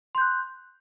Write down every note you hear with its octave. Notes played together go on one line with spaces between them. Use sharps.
C6 F#6 G6